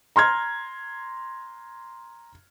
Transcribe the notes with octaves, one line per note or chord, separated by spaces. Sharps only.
A#5 C6 F6 G#6